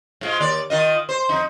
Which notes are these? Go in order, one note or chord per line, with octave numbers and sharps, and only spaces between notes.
G#2 G#3 F4
D#2 D5
D#3 F4 D#5
C5
F2 D#4